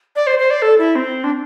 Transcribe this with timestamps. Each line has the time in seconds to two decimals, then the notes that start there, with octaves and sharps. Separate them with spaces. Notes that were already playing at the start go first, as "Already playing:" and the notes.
0.16 D5
0.27 C5
0.39 C5
0.50 D5
0.62 A4
0.78 E4
0.95 C4
1.24 D4